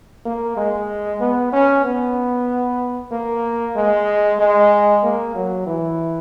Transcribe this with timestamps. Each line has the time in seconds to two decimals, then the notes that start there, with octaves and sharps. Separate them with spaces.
0.25 A#3
0.57 G#3
1.20 B3
1.53 C#4
1.84 B3
3.12 A#3
3.76 G#3
4.39 G#3
5.03 A#3
5.35 F#3
5.66 E3